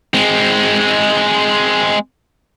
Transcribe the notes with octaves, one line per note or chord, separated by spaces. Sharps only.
G#3 C4